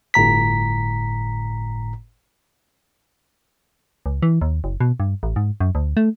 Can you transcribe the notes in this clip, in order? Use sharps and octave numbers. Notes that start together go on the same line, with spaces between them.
G1 A2 A#5 B6
C#2
E3
D#2
F#1
B2
G2
A1
G#2
F#2
D2
A3